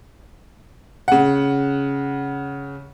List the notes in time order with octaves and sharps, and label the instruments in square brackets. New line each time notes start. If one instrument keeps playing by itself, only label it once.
[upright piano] C#3 F#5